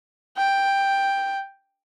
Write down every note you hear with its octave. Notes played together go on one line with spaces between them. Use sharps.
G5